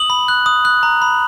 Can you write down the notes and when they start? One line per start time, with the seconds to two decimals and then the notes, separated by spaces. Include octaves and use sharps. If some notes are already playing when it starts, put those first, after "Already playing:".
Already playing: D#6 F#7
0.10 B5
0.28 F#6
0.46 D#6
0.65 F#6
0.83 A#5
1.02 B5